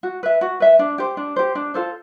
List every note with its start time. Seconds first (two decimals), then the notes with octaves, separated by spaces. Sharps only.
0.03 F#4
0.23 B4 E5
0.41 F#4
0.60 B4 E5
0.79 D4
0.98 G4 C5
1.17 D4
1.36 G4 C5
1.55 D4
1.74 F4 A4 C5